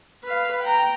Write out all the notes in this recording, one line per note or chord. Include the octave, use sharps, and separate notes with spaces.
B4 F5
G5 A#5